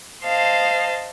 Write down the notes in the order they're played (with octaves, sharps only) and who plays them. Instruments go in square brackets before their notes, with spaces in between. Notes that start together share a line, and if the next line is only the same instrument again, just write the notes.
[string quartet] C5 D#5 F5 A5